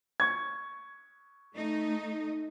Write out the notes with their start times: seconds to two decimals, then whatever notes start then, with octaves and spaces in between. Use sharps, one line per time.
0.20 C#6 G#6
1.56 A3 D#4